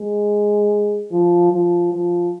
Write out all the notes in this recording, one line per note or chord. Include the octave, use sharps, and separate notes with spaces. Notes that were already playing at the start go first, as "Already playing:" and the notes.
Already playing: G#3
F3
F3
F3